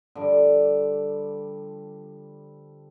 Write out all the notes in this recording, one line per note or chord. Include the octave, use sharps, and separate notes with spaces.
D3 F3 G3